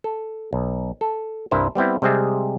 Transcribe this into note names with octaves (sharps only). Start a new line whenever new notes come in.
A4
B1
A4
C2 G2 E4 A#4 C5
G3 B3 C4 E4
C3 G3 G#3 C4 G#4 E5